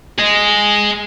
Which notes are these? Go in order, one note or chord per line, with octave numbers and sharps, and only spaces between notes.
G#4 D#5